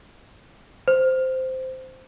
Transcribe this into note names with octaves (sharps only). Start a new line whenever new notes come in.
C5